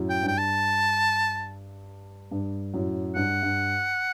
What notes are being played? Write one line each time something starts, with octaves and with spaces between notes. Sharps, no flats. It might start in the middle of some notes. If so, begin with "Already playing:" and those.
Already playing: F#2 A2
G5
G2 G5
A5
G2
F#2 A2
G2 F#5
G2